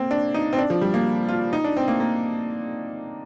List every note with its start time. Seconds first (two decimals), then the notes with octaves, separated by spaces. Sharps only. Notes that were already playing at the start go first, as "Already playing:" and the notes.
Already playing: A#3 C4
0.11 D4
0.34 D#4
0.53 C4
0.58 D4
0.70 F3
0.81 G3
0.94 A#3
1.29 F4
1.53 D#4
1.64 D4
1.77 C4
1.88 A#3
2.00 A#3